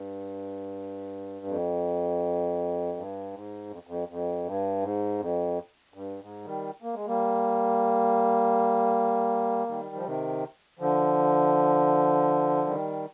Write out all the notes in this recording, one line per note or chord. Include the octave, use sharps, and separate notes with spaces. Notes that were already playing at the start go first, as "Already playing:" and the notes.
Already playing: G2
F2
G2
G#2
F2
F2
F2
G2
G#2
F2
G2
G#2
D#3 G3
A#3
G#3
G3 A#3
D#3 G3
F3
C3 D#3
D3 F3
D#3 G3